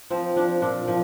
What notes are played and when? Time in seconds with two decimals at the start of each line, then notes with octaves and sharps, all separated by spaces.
0.10 F3 C4
0.36 F3 D4
0.62 A#2 D4
0.88 F3